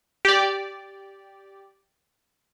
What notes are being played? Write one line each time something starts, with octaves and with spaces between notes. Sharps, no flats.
G4 D5